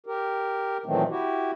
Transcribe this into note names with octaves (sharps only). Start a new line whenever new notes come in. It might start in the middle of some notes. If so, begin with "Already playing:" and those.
G4 A#4
A#2 D#3 E3 F#3 A3 C4
E4 F#4 G4